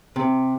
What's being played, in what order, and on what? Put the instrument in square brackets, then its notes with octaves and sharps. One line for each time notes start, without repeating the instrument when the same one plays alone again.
[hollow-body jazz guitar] C3